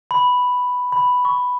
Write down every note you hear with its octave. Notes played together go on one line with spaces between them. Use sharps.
B5
B5
C#6